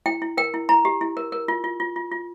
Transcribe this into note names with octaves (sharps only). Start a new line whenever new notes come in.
E4 G5
E4
A#4 G5
E4
E4 A#5
G4
E4
A#4
A#4
F4
F4
F4
F4
F4